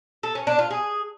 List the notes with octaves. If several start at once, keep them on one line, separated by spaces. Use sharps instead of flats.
A4
C#4
D4
F4
G#4